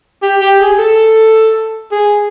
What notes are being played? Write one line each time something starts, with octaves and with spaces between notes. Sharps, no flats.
G4
G4
G#4
A4
G#4